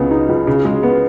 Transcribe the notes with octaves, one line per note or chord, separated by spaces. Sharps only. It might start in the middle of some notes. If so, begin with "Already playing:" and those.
Already playing: C#2 C#3 B3
D#4
C#2
C#3
G#3
B3